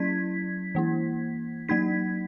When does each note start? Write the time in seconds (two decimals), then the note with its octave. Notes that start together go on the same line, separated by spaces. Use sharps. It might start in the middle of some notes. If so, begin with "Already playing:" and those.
Already playing: F#3 C#4 E4 G#6 B6
0.75 E3 A#3 E4
1.69 F#3 A#3 D#4 G#6 B6